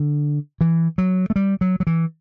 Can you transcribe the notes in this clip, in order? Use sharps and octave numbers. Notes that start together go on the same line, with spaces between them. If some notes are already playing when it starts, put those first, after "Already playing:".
Already playing: D3
E3
F#3
A3
G3
F#3
F#3
E3